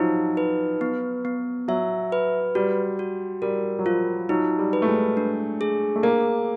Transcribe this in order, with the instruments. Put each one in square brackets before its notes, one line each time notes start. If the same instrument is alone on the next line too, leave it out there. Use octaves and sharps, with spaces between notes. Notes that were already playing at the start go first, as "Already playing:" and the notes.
Already playing: [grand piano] F3 F#3 [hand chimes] D#4
[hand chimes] B4
B3
B3
[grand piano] F#3 [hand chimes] E5
[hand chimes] B4
[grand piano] G3 [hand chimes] F#4
[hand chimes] F#4
[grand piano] G3 [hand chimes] A#4
[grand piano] F#3
[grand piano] F3 [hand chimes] F4
[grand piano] F#3 [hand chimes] D#4
[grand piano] G3
[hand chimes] B4
[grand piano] A3
G#3
[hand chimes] D4
G#4
[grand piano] A3
[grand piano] A#3 [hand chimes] A#4